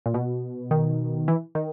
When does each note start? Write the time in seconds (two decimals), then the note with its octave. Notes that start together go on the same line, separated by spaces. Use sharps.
0.06 A#2
0.14 B2
0.71 D#3
1.28 E3
1.55 D#3